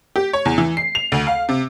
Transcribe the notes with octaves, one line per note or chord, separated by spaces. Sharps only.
G4
C#5
E2
E3
C7
F7
D2
F5
C3